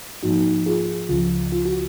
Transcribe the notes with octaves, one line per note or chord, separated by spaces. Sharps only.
G#2 F3 A#3 D#4 F#4
F4 G#4
C#2 C#3 F3 F4
F4
F#4